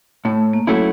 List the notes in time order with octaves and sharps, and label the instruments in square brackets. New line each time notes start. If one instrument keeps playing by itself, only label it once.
[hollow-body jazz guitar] A2 [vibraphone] A3
[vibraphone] A#3
[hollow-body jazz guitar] F#3 A3 C#4 E4